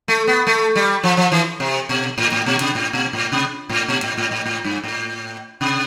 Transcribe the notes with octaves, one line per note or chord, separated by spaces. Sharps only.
A3
B3
A3
G3
F3
F3
E3
C3
B2
A2
A2
B2
C3
A2
B2
A2
C3
A2
B2
A2
A2
A2
A2
G2
A2
C3